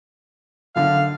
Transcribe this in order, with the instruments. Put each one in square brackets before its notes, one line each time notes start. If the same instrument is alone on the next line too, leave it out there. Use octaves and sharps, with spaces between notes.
[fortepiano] F#2 D3 [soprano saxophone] F5